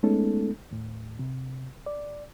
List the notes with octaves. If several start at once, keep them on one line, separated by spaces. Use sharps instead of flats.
G#3 A3 B3 C#4 D#4 A4
D#2 A2
C3
D5